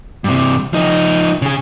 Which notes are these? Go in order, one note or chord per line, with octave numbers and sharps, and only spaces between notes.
G2 C3
F3 D#4
C#3 G#4